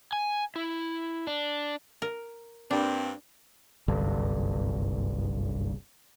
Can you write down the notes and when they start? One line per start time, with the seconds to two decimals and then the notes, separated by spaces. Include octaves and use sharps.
0.13 G#5
0.56 E4
1.27 D4
2.02 A#4
2.71 G2 A#3 C4 D4
3.88 F#1 C2 G2 D3